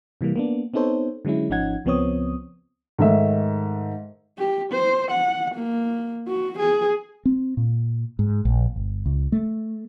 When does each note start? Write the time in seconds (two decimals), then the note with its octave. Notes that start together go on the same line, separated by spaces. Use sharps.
0.21 C3 E3 G3 A#3
0.36 A#3 B3 D4
0.74 B3 C4 D#4 A4 C5 C#5
1.25 D3 F#3 G#3 C#4 E4
1.50 G#1 F3 C#4 D#4 F#5 G#6
1.85 C#2 F3 B3 C4 C#5 D#6
2.98 G#2 D#3 A3 E5
4.38 G4
4.72 C5
5.11 F#5
5.54 A#3
6.28 F#4
6.59 G#4
7.25 C4
7.57 A#2
8.19 G#2
8.45 A#1
8.76 G1
9.06 C#2
9.32 A3